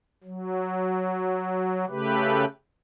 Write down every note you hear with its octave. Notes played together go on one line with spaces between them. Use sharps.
F#3
C#3 A3 G4 B4